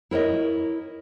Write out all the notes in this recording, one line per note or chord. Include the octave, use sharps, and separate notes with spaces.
E4 A#4 C#5 D#5